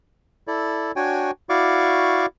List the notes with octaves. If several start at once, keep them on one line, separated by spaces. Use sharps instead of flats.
E4 A4 D5
D4 F#4 C#5 G5 G#5
E4 F#4 D5 F5 C#6 D6